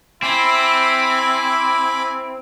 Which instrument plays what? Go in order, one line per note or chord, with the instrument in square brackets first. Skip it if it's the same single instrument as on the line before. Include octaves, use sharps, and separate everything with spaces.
[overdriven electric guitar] C4 [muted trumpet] E4 [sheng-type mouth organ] G#5 B5 D6